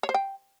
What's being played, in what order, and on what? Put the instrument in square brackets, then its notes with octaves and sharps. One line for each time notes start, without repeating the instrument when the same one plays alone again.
[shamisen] C#5
C5
G5